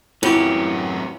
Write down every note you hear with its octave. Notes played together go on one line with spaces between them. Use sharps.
F#2 E3 F#3 C4 C#4 E4 F4 G4